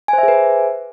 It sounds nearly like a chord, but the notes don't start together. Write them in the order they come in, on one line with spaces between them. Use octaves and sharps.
G#5 C5 E5 G#4 B4